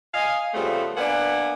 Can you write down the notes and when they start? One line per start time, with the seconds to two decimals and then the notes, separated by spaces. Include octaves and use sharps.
0.14 D#5 F5 G#5
0.54 C#3 F3 G3 A3 B3 C4
0.97 A#3 B3 D4 F#5 G#5